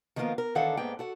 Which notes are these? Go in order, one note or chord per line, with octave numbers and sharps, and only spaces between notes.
D#3 F3 A#3 B3 F4 A#4
A#4
D#3 E3 D4 A4 F5 F#5
G#2 A#3 B3 G#4 G5
F#4 A4 F#5